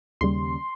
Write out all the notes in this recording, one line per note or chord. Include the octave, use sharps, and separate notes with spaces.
D#2 C#3 G3 C6